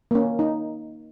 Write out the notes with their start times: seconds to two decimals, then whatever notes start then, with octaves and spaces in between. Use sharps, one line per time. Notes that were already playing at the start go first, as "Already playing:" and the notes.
0.11 A#3 C#4
0.39 D#4